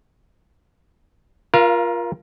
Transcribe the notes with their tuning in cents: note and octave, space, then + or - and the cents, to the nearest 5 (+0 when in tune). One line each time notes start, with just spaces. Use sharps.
F4 +0 A#4 +25 F5 -30